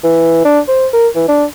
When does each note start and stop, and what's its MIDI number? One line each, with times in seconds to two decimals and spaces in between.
0.03 0.44 52
0.45 0.59 62
0.68 0.86 72
0.93 1.08 70
1.16 1.24 52
1.29 1.45 62